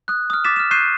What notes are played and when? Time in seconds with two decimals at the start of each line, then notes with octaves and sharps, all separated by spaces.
0.08 D#6 F#6
0.30 D#6 F6
0.44 D6 A6 B6 E7
0.56 F6 E7
0.71 C#6 F#6 G6 C7 D#7 E7